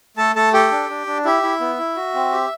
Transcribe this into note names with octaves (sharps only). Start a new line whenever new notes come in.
A3 A4 A5
A3 A4 A5
G4 A4 G5
D4
D4
D4
E4 G4 E5
E4
B3
E4
F#4
C4
G4